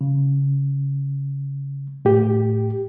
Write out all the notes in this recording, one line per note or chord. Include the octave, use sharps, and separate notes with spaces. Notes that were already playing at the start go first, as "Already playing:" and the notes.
C#3
A2 G4